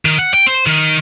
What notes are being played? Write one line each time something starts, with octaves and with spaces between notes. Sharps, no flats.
D#3
F#5
G5
C5
D#3